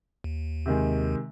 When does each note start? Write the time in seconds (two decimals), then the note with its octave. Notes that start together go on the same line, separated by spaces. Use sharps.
0.24 D#2
0.66 C3 D#3 G#3